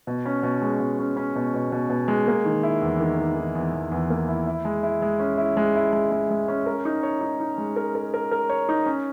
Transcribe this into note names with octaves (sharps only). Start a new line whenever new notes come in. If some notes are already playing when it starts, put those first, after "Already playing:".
B2
C#4
B2
G#3
B2
C#4
C#4
B2
B2
B2
B2
G#3
A#3
D#3
E4
E2
D#3
D#3
D#3
E2
E2
E2
A#3
E4
E4
G#3
E4
G#3
C#4
E4
G#3
E4
G#3
G#3
G#3
C#4
A#4
D#4
C#5
D#4
D#4
G#3
A#4
A#4
A#4
A#4
C#5
D#4
C#4